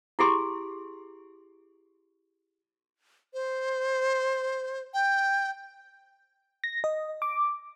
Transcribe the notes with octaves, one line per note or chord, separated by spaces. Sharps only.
E4 G4 G#4 C6 C#6
C5
G5
A#6
D#5
D6